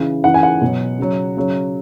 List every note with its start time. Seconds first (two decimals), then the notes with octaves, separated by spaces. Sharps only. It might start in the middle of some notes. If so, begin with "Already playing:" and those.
Already playing: C#3 E3
0.24 C#3 E3 F#5
0.34 G#5
0.43 F#5
0.62 B2 F#3
0.98 C#3 F#3
1.37 C#3 F#3